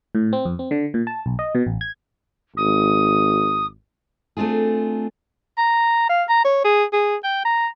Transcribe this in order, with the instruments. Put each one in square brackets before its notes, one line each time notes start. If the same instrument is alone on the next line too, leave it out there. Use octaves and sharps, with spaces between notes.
[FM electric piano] A2
C4
F2
C4
D3
A#2
A5
B1
D#5
B2
A1
G#6
[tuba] G#1 [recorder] D#6
[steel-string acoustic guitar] A3 C4 D4 F4 G#4
[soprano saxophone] A#5
F5
A#5
C#5
G#4
G#4
G5
A#5